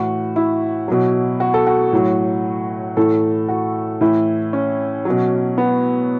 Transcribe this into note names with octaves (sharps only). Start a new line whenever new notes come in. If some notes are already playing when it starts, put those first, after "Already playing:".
Already playing: A2 E3 F#4
E4
B2 F#3
F#4
A4
F#4
A2 F#3
A2 E3 A4
F#4
A2 E3 E4
C#4
B2 F#3
B3